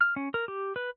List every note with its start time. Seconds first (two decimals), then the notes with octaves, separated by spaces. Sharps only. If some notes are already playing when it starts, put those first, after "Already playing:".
0.01 F6
0.16 C#4
0.34 A#4
0.48 G4
0.76 B4